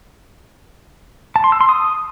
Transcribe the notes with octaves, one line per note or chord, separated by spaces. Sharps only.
A5
C6
E6
C6
D#6